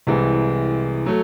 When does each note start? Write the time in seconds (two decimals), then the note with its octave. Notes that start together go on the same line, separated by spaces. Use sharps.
0.07 C2 C3 E3 G#3
1.06 F#3 A3